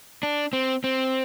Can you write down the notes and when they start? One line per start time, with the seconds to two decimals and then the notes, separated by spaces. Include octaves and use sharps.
0.23 D4
0.53 C4
0.84 C4